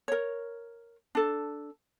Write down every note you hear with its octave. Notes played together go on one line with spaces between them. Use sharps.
A#4 C#5
D4 A4